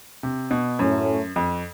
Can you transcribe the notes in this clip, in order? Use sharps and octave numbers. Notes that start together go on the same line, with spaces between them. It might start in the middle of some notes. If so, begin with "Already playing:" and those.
C3
B2
F#2 A2 F#3 A3 C#4
F2